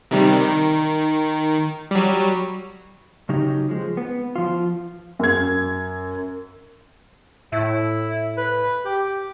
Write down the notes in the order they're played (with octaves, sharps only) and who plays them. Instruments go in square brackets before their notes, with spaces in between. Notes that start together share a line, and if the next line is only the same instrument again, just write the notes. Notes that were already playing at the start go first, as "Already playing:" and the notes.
[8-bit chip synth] C3 D#3 G3
D#3
F#3 G3
[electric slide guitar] C#3 F#3 D#4 G4
F3 G#3
B3
F3 F4
[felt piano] F#2 G#6
[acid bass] A2 [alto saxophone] E4
[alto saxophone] B4
G4